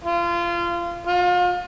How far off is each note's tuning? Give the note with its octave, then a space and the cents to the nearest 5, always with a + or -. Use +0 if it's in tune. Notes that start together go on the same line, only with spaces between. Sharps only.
F4 -25
F4 +35